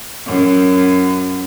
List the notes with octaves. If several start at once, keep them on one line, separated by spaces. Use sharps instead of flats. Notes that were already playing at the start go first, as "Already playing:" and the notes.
F#2